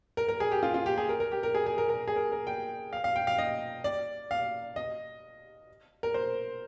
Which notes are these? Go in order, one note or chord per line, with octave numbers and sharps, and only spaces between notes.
A#4
A#4
G#4
G4
F4
F4
G4
G#4
A#4
A#4
G4
A#4
G#4
G#4
A#4
A#4
G#4
A#4
A#4
G5
F5
F5
G5
F5
D#5
D5
F5
D#5
A#4
C5